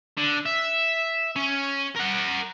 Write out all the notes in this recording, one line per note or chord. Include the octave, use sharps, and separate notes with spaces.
D3
E5
C#4
A#4 F#5